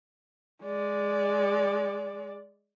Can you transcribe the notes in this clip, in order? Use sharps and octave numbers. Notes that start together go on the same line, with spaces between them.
G#3 D5